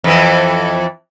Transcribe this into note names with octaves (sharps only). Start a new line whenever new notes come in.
F2 E3